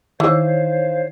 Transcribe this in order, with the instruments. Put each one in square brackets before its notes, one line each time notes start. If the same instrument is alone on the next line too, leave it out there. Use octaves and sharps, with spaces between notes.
[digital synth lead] D#3 [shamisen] E3 [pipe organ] C5 C#5 F5